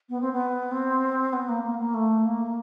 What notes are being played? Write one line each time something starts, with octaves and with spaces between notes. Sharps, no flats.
B3
C4
B3
C4
B3
A#3
A#3
A#3
A3
A#3